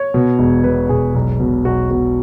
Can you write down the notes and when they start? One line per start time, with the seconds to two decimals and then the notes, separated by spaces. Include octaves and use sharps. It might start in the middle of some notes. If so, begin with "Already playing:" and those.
Already playing: C#5
0.14 B2
0.39 E1
0.64 B2 B4
0.89 E1 G#4
1.14 B1
1.40 B2
1.65 B1 F#4
1.90 B2 F#4